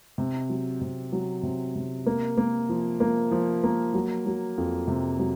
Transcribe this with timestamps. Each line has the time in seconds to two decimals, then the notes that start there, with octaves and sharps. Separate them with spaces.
0.18 C3
0.50 F#3
0.81 C3
1.12 F#3
1.43 C3
1.76 C3
2.06 A#3
2.38 A#3
2.69 F3
3.00 A#3
3.31 F3
3.64 A#3
3.94 F#3
4.26 F#3
4.58 F2
4.88 C3
5.19 F#3